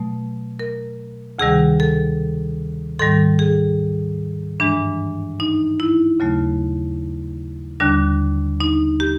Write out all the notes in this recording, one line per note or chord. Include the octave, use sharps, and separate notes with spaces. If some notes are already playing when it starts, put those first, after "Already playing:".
Already playing: B2 F#3 A3
A#4
D2 C3 D#3 G3 G#4
A4
G#2 D#3 G3 A4
G#4
G2 E3 G#3 D4
D#4
E4
D#2 C#3 F#3 A3
D#2 D3 G3 D4
D#4
G4